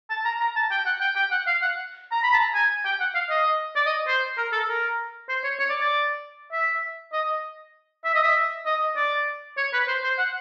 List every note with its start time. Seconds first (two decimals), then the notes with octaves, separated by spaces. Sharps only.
0.10 A5
0.25 A#5
0.41 A#5
0.56 A5
0.71 G5
0.86 F#5
1.01 G5
1.16 G5
1.31 F#5
1.47 F5
1.62 F#5
2.12 A#5
2.23 B5
2.34 A5
2.39 A#5
2.54 G#5
2.85 G5
3.00 F#5
3.15 F5
3.30 D#5
3.76 D5
3.86 D#5
4.08 C5
4.37 A#4
4.53 A4
4.69 A#4
5.29 C5
5.44 C#5
5.59 C#5
5.70 D5
5.81 D5
6.52 E5
7.13 D#5
8.05 E5
8.14 D#5
8.23 E5
8.66 D#5
8.96 D5
9.57 C#5
9.73 B4
9.88 C5
10.04 C5
10.19 F#5